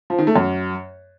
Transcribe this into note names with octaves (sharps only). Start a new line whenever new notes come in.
F3
D#3
A3
F#2